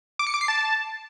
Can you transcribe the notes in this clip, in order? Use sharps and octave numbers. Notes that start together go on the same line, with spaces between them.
D6
C#7
D6
C7
A5